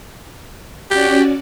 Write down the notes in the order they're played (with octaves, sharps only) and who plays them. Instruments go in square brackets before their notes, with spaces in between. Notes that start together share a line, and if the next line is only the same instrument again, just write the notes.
[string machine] C#4 F#4 D5 [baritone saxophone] G4